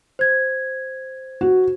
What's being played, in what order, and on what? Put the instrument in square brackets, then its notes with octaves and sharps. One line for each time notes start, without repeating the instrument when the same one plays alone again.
[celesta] C5 G#6
[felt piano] F#4